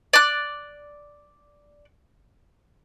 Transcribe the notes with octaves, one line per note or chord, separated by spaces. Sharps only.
D5 F#6